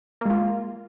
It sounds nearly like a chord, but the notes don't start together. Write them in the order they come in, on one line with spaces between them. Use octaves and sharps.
A#3 G#3 F4